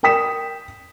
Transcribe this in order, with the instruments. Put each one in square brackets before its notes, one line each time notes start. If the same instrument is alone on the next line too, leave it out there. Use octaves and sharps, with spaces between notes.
[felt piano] A#4 G5 D#6 B6 E7